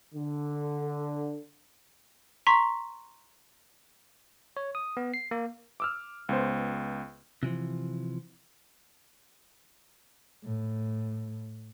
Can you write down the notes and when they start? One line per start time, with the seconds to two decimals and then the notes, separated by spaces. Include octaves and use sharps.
0.14 D3
2.47 A#5 C6 C#6 B6
4.57 C#5
4.75 D#6
4.97 B3
5.14 C7
5.31 A#3
5.80 D6 E6 F6
6.29 C#2 B3 C5
7.43 C3 E3 F3
10.44 A2